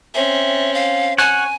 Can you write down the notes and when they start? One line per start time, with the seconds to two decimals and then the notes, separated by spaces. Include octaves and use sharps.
0.15 C4 C#4 E5
0.74 F5
1.18 C#5 F#5 G#5